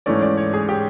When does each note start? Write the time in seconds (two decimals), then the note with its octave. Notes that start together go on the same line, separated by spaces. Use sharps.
0.06 G#2 E3 A3 C#4 D5
0.22 D5
0.37 C#5
0.54 G#4
0.69 G4